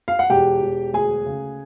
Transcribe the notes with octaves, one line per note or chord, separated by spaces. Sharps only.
F5
F#5
E1 G4 G5
E1
D2 G#4 G#5
C#3